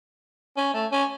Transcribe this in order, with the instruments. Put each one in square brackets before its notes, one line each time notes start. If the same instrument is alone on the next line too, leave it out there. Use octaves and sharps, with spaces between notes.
[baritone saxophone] C#4
A3
C#4